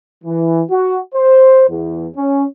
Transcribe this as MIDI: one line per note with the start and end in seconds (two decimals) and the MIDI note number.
0.24 0.63 52
0.71 0.98 66
1.15 1.65 72
1.69 2.07 40
2.16 2.44 61